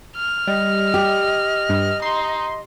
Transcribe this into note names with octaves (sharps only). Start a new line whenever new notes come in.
F6
G3 D#5
G4
G2
D#4 C6